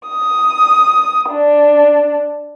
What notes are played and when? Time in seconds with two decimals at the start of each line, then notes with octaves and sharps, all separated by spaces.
0.10 D#6
1.30 D4